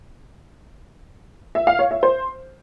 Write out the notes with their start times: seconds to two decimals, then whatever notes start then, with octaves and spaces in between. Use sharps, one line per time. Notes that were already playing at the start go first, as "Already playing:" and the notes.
1.55 E5
1.67 F5
1.79 C#5
1.91 E5
2.03 C5